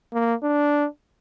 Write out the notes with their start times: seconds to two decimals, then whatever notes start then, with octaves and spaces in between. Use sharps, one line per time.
0.13 A#3
0.43 D4